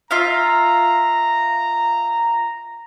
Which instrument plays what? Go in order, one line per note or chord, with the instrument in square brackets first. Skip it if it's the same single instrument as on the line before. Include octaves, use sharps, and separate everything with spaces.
[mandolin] F4 E5 F5 [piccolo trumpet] A#5